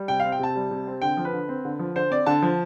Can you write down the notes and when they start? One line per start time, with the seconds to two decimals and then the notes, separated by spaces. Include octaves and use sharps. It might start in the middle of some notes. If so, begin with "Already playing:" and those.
Already playing: G3
0.08 C3 G5
0.20 C4 F5
0.32 G5
0.39 C3 A5
0.55 G3
0.71 C3
0.87 C4
1.02 D3 G5
1.17 F3
1.25 B4
1.33 D3
1.48 C4
1.65 D3
1.79 F3
1.96 D3 C5
2.10 C4 D5
2.26 D3 A5
2.42 F3